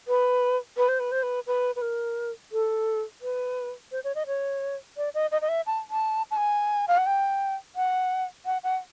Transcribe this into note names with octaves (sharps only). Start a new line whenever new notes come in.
B4
B4
C5
B4
C5
B4
B4
B4
A#4
A4
B4
C5
C#5
D#5
C#5
D5
D#5
D#5
D#5
E5
A5
A5
A5
G#5
F5
F#5
G5
F#5
F#5
F#5